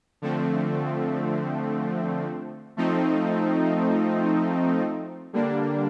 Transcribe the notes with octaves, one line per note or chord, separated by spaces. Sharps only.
D3 F3 A3 C4
F3 A3 C4 D#4
D3 G3 A#3 D4